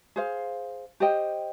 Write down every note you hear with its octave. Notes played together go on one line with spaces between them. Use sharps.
G#4 C5 F5
G4 C5 D#5 G5